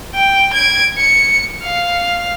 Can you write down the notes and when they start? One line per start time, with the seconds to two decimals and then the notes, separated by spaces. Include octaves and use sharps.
0.15 G5
0.53 G#6 D7
0.98 C#7
1.63 F5